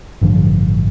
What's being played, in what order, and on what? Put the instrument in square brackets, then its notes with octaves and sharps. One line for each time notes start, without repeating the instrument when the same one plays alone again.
[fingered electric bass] A1 G2 D3 F3